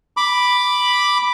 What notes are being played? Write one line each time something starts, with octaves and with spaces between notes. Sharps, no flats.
B5 D6